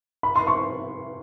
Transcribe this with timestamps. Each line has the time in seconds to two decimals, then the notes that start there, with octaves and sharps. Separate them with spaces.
0.23 B5
0.36 C6
0.47 C#6